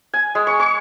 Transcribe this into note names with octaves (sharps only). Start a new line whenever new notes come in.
G#5
G#3
C#6
C#6